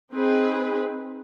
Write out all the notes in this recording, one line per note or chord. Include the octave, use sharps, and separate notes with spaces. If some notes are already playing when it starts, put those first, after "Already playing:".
C4 D#4 G#4 B4